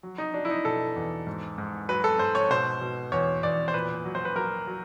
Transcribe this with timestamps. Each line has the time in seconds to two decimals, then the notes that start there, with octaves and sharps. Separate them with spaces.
0.03 F#3
0.18 D#4
0.34 F#3 D4
0.45 E4
0.50 D#4
0.65 B2 A4
0.96 E2
1.27 G#2
1.58 G#2
1.89 F#3 B4
2.04 A4
2.19 G#2 C5
2.35 C#5
2.50 B2 C5
2.81 B2
3.12 E2 C#5
3.43 E2 D5
3.68 C5
3.74 A#2 B4
4.05 F#3
4.15 C5
4.25 B4
4.36 F#3 A#4
4.67 F#3